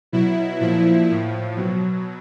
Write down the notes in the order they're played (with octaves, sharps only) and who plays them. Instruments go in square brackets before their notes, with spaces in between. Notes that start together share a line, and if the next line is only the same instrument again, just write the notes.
[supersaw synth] B2 F#3 E4
A#2 F3 E4
A2 F3
B2 F#3